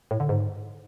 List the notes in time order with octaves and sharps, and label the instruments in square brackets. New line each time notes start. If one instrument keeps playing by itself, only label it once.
[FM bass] A2
D3
G#2